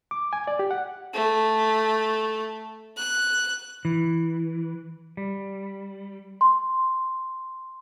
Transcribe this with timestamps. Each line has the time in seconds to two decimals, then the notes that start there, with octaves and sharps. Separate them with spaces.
0.11 D6
0.33 G#5
0.47 D5
0.59 G4
0.71 F#5
1.14 A3
2.96 F#6
3.85 E3
5.17 G3
6.41 C6